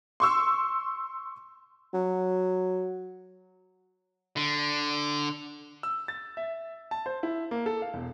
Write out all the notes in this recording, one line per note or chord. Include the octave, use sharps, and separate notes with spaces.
C6 C#6 E6
F#3
D3
E6
A6
E5
A5
C5
E4
A#3
A4
F5
E1